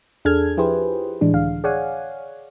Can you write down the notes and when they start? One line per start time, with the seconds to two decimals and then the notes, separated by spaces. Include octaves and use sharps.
0.25 E2 D4 G#4 A4 F6 G#6
0.57 F3 E4 G4 G#4 B4 C5
1.21 A2 E3 G#3 D4
1.33 C#2 D3 F5
1.64 G#4 C#5 D5 F5 F#5 G#5